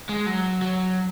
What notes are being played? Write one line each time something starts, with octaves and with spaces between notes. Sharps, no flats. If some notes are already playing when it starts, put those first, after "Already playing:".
G#3
F#3
F#3